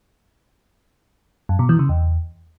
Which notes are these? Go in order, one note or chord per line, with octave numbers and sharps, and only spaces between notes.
F#2
B2
E3
C#3
E2